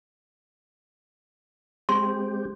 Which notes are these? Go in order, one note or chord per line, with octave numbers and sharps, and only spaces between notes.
G#3 C4 G4 C6